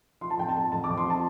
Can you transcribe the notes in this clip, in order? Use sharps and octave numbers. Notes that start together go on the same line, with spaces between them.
F3 C6
A5
F2 G5
A5
F2
F2 A5
F2 D6
C6
F3 A5